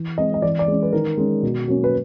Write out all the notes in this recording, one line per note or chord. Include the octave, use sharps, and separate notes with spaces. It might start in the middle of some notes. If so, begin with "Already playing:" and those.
Already playing: E3
G#3 C4 D#5
D#5
E3 D5
D5
G#3 C#4
B4
D#3 A#4
G#3 C#4
B2
F#3 A#3 C#4
B4